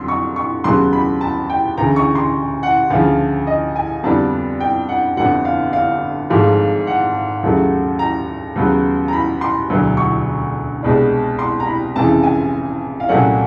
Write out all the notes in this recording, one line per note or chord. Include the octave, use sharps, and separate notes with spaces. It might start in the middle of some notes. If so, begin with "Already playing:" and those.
Already playing: F2 D3 F#3 C6
C#6
C#6
D#2 C#3 F#3 B3 C6
B5
A5
G5
D2 C#3 E3 A#5
C#6
C6
F#5
D2 C#3 F3 F5
D#5
G#5
F2 D3 G3 B3 D4 A5
G5
F#5
G1 F2 D3 F#5
F5
F5
G#1 G#2 F3 A3
F#5
D#2 C#3 F#3 A3
A#5
D#2 C#3 F#3 B3
A#5
B5
C6
E1 D2 D3 F#3
C#6
C2 B2 G#3 B3 D4
C6
A#5
B5
F1 F2 C#3 E3 A5
G#5
F5
C2 A#2 F#3 A3 C#4 F#5